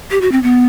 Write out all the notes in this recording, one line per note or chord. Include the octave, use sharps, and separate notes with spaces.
G4
F#4
C4
B3